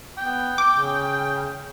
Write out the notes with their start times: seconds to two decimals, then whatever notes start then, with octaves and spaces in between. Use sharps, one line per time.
0.18 B3 G5
0.58 D6
0.75 C#3